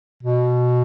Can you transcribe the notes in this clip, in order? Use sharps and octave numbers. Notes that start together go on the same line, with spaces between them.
B2